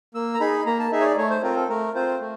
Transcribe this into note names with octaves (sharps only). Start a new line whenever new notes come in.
A#3 E6
A#5
D#4 G#4 B5
A#3 A#5
A5
D#4 G#4 E5
C#5
D5
A3 C#5
C5
C4 F4 A#4
A4
A3 A#4
C4 F4 C5
A3